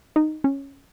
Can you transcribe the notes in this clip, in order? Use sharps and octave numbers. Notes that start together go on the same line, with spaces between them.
D#4
C#4